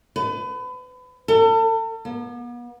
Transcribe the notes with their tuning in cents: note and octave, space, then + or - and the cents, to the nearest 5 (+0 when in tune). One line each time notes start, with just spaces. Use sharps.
B4 +30
A4 +40
B3 -40